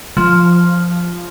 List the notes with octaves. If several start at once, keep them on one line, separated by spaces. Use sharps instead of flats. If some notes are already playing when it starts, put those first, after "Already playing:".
F3